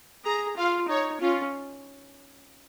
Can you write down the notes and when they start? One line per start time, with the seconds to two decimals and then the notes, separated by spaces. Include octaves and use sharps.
0.24 G#4 A#5
0.57 F4 F5
0.88 D#4 C#5
1.21 C#4 F4